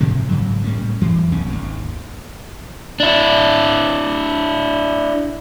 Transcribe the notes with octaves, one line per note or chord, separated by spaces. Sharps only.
G#2 C3 F3 G#3
G#2 C#3 F#3
A2 G3 A#3 C#4
F2 E3
F1 B1 C#4
G#1 D#2
D4 E4